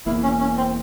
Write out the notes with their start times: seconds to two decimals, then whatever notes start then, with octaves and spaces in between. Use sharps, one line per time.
0.06 E1 E2 E3 A#3 E4
0.23 C#4
0.40 C#4
0.57 C4